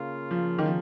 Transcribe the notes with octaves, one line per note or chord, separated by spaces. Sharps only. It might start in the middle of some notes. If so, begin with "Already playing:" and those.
Already playing: C#3 A#3 F4
F3
D#3
F3